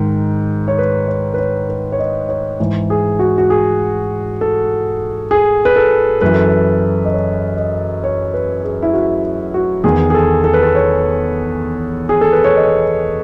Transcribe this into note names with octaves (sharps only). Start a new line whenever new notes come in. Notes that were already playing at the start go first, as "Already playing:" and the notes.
Already playing: G#2 D#3
C#5
B4
C#5
B4
C#5
B4
C#5
D#5
C#5
G#2 E3
G#4
F#4
F#4
G#4
A4
G#4
B4
A4
F#2 E3 B4
A4
B4
D#5
C#5
D#5
C#5
B4
G#4
E4
F#4
F#4
E2 D#3 G#4
G#4
A4
A4
B4
A4
C#5
G#4
A4
B4
C#5
D#5